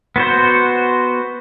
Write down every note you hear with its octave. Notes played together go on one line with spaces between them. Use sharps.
B3 F#4 C5